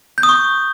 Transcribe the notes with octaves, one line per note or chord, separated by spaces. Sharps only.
G6
D#6
C#6